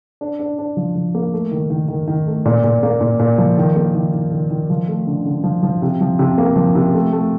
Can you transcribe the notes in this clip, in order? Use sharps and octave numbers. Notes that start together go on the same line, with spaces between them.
D4
D4
D4
F3
F3
A#3
A3
D#3
D#3
D#3
D#3
A3
A#2
A#2
A#3
A#2
A#2
F3
D#3
A#3
D#3
D#3
D#3
D#3
F3
A3
D3
D3
F3
F3
C3
F3
C3
A#3
F3
C3
A3
A3